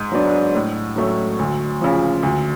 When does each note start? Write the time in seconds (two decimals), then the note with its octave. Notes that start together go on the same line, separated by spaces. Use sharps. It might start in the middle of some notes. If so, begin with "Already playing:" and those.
Already playing: G#2
0.12 F#3 B3 D4
0.55 A2
0.96 F#3 A3 C#4
1.39 D2
1.81 C#3 F3
2.23 D2